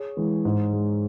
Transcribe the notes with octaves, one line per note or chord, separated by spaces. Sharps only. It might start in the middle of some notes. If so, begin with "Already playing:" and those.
Already playing: G#4 C#5
E3 G#3
G#2
G#3